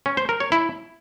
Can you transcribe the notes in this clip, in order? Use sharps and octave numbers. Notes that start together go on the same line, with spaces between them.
C#4
C5
A#4
C#5
E4